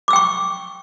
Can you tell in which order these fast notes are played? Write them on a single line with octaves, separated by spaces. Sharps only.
D6 E6 G5 C#6